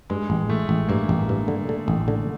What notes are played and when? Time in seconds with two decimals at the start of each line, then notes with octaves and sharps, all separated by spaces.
0.10 G2 G#3
0.30 A1
0.49 A1 A3
0.69 A1
0.89 G2 A#3
1.09 A1
1.29 G2
1.48 D3
1.69 D3
1.88 A1
2.08 D3